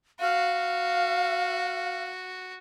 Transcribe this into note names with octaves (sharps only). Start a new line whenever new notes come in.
F#4 F5